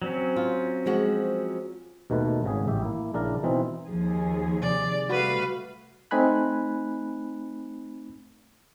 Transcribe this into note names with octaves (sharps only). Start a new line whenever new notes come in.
F#3 C4 C#4
F4
F3 G#3 F#4
D#2 B2 D#3 A3 B4
G#1 C#3 G#4
A1 G4 E5
A#3 E4
A#1 C#3 D4 E4 A#4 D5
B2 E3 C4 D#4
D#2 F3 G#4
C3 D5
G3 A3 F#4 B4 F5 F#5 B5
A3 C4 D#4 G#5 B5 F#6